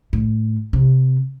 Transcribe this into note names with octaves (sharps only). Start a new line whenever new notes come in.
A2
C3